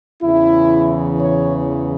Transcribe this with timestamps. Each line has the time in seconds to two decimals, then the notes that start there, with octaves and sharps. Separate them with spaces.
0.22 E2 C#3 E3 E4
1.20 C#5